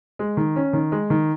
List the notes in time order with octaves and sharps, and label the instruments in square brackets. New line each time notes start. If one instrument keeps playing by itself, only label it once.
[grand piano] G#3
D#3
C#4
D#3
G#3
D#3